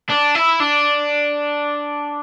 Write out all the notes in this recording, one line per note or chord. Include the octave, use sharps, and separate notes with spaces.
D4
E4
D4